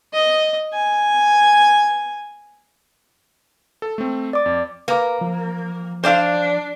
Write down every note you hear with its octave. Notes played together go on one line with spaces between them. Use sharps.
D#5
G#5
A4
A3 C4
D5 D6
F2
A#3 B4 D6
F3
D4 C5 D5 F5